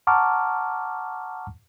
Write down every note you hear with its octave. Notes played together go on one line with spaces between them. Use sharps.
F#5 A5 A#5 C#6 D6 F6